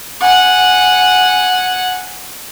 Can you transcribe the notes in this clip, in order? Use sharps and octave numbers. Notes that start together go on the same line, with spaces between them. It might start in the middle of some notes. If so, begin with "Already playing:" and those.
F#5 G#5